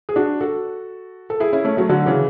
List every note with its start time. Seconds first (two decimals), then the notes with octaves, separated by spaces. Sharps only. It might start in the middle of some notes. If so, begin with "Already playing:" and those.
0.09 G#4
0.16 D4 F#4
0.40 F#4 A4
1.30 A4
1.40 E4 G#4
1.53 C#4 E4
1.65 A3 C#4
1.77 F#3 A3
1.89 D3 F#3
2.06 C#3 E3